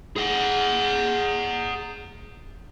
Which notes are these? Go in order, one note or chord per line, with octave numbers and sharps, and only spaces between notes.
G#4 F#5